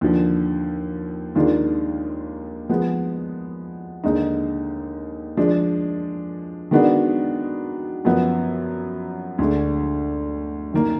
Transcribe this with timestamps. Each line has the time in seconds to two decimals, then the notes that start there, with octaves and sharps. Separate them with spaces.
0.01 D#2 D3 F3
1.35 D#2 D#3 G#3 D4 F4
2.69 F3 G#3 B3
4.04 D#2 D3 G#3 D#4
5.37 F3 G#3 D4
6.71 D#3 G#3 B3 D4 F#4
8.05 F#2 F3 B3
9.38 D2 D3 G#3
10.73 F#2 D#3 A#3